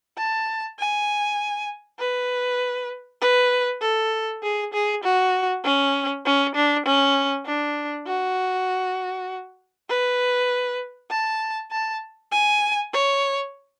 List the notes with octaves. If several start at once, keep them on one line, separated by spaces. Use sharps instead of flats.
A5
G#5
B4
B4
A4
G#4
G#4
F#4
C#4
C#4
D4
C#4
D4
F#4
B4
A5
A5
G#5
C#5